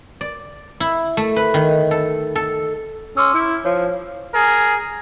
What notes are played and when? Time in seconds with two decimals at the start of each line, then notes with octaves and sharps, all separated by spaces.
0.21 D5
0.80 E4
1.17 A3
1.36 B4
1.54 D#3
1.91 A4
2.36 A4
3.17 C#4 C6 D6 E6
3.34 E4
3.65 F3 C#5
4.34 G#4 A#4